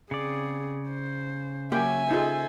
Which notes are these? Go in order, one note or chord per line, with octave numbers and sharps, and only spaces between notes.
C#3 C4 G#4 D5
C5
F#3 A#3 C#4 G4 E5 G5 G#5
D#4 F4 G#4 A4 C5